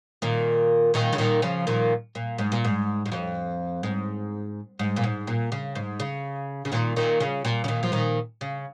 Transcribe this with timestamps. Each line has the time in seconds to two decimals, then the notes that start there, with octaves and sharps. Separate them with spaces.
0.22 A#2 D#3
0.94 A#2 D#3
1.13 C#3
1.18 A#2 D#3
1.42 C#3 F3
1.67 A#2 D#3
2.15 A#2
2.38 G#2
2.52 A#2
2.64 G#2
3.06 G#2
3.12 F2
3.83 G#2
4.79 G#2
4.96 A#2
5.04 G#2
5.27 A#2
5.52 C#3
5.75 G#2
6.00 C#3
6.65 C#3
6.72 A#2 D#3
6.96 A#2 D#3
7.20 C#3
7.45 A#2
7.64 C#3
7.68 A#2 D#3
7.83 F3
7.92 A#2 D#3
8.41 C#3